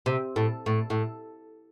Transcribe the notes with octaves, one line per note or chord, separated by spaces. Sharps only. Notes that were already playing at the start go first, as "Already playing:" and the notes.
C3
A2
A2
A2